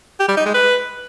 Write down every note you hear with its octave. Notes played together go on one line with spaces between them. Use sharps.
G4
G3
D#4
G#3
B4